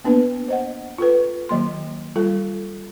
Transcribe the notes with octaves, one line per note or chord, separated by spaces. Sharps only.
A#3 B3 D4 B4
C5 D#5 F#5
F4 A4 B4
D#3 F#3 A#3 C6
G3 F4 A4